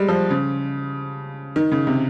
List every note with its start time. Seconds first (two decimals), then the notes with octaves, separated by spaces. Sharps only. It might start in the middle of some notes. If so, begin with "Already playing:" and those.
Already playing: G3 G#3
0.09 F3
0.30 C#3
1.56 D#3
1.72 C#3
1.87 C3